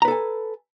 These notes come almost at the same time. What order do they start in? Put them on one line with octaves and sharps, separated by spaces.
A#5 B4 A4 G#5